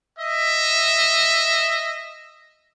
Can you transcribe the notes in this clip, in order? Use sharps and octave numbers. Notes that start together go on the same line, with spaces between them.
D#5 E5